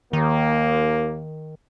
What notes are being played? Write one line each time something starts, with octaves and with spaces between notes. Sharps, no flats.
D#2 D#3 A#3